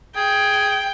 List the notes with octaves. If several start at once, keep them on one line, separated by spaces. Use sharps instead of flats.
G#4 G5